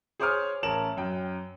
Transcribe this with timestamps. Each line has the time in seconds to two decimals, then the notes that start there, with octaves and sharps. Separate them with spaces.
0.20 G#4 C5 C#5 D6 D#6 F6
0.63 A1 C#4 A#4 A5 E7 F#7
0.97 F#2 G5